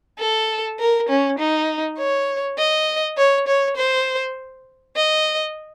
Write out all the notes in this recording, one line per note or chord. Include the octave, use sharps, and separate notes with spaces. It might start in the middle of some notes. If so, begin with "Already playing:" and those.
A4
A#4
C#4
D#4
C#5
D#5
C#5
C#5
C5
D#5